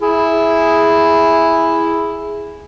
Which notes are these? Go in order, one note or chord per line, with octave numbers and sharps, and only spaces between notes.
E4 G#4